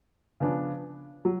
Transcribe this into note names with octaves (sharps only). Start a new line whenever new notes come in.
C#3 F3 B3 D4
F#3